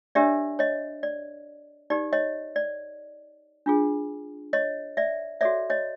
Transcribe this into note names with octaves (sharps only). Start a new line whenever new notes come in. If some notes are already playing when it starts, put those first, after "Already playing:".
D4 G4 A#4 C#5 D5 E5
C#5 D#5
D5
D#4 G4 B4 D5
C#5 D#5
D5
D4 F4 G#4
C#5 D#5
D5 E5
F#4 A4 C#5 D5 E5
C#5 D#5